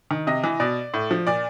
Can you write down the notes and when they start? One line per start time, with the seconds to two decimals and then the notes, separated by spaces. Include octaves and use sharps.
0.11 D#3
0.27 C3 D#5
0.44 E3
0.60 B2 D5
0.94 A2
1.11 F3
1.27 A#2 D5